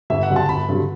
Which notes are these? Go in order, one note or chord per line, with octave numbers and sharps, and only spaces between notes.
G1 E5
F#5
G2 D3 F#3
A5
G1 B5
G2 D3 F#3